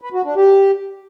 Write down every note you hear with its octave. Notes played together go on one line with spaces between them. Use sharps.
B4
F#4
D4
G4